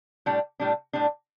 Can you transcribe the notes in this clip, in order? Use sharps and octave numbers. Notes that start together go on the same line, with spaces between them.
A2 G3 D4
A2 G3 D4
A2 G3 D4